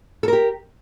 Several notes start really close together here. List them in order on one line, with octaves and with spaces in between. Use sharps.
A4 A#4 G4